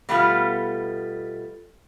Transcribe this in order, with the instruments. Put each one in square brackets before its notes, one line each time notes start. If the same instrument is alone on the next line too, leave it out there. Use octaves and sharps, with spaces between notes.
[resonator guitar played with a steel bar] B2 G3 A3 B3 F4